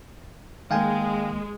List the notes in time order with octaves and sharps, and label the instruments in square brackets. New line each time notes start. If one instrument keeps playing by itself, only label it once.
[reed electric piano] D#3 A#3 [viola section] G#3 [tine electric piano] F5 G5 G#5